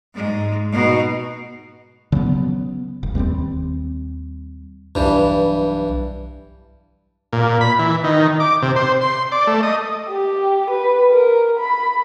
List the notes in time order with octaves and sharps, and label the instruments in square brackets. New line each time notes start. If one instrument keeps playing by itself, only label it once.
[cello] G#2 G#3
B2 D#4
[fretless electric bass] C#3 F#3 A3 B3
E1
D#2 G3 B3 C4
[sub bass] B1 [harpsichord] G2 E3
[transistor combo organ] A#2
B5
E3
D#3
D6
C3
C5
C6
D5
A3
D#5
[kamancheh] G4
B4
A#4
B5